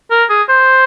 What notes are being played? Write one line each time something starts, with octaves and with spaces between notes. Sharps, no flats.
A#4
G#4
C5